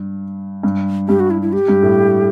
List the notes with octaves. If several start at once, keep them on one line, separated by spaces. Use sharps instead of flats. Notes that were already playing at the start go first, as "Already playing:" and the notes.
Already playing: G2
G2
G2 G4
F#4
E4
E4
G4
G2
A2